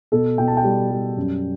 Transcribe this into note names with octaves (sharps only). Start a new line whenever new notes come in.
B2 A4
B2 G5
A5
G5
G3
G3
F#2